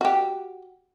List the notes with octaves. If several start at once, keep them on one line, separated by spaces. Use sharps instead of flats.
F#4 G4